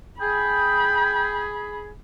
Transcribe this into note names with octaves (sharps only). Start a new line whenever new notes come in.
G#4 G5 B5